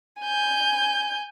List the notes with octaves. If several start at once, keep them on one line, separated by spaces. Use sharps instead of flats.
G#5 G6